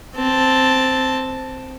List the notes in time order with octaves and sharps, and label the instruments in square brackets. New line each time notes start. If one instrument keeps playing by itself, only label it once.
[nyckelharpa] C4 A5